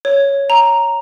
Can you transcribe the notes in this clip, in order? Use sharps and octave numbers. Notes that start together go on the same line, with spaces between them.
C#5
A#5